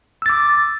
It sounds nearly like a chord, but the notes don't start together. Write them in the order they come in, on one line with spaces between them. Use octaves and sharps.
E6 A6 D6